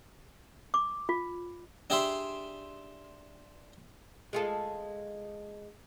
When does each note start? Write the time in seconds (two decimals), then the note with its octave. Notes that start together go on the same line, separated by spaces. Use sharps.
0.74 D6
1.09 F4
1.90 D4 G4 G#4 D5 E5 C6
4.33 G#3 F4 A4